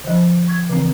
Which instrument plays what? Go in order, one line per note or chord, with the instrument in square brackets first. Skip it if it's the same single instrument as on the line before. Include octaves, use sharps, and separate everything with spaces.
[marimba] D3 F3
C#6 G#6
C#3 E3 C4